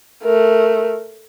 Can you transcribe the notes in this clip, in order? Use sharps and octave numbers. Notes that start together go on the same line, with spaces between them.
A3 A#4